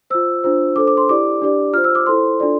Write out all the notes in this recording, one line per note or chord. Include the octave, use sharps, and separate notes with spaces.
F4 C5 E6
D4 F4 C5
D4 A4 C5 D6
D6
C6
E4 G4 D5 D6
D4 G4 D5
F4 C5 F6
E6
D6
E4 A4 C5 C6
D4 F4 A4 D5